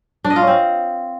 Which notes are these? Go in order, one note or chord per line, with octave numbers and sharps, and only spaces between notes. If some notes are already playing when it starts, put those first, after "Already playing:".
D4
D#5
F4
C#4
C4